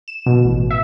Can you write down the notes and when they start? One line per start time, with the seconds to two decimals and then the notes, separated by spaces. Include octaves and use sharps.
0.08 E7
0.26 B2
0.44 A1
0.71 E5